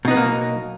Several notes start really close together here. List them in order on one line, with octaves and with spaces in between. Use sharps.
B2 D#4 B3 F#3 A#3